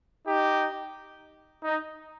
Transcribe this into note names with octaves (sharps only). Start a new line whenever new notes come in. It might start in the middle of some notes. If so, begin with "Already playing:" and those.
D#4 G4
D#4